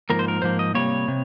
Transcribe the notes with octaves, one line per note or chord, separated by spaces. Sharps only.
G#2 F3 A#3 A#4
C5
A#4
G#2 F3 A#3 C5
D#5
C3 G3 A#3 C#5
C3